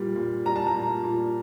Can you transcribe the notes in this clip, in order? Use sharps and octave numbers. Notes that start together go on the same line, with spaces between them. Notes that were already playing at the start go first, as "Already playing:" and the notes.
Already playing: A#2 G3
A#2
G3 A#5
A5
A#5
A#2
A#2